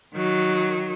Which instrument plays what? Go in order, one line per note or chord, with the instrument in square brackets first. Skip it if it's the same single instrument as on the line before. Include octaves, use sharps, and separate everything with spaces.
[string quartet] D#3 F#3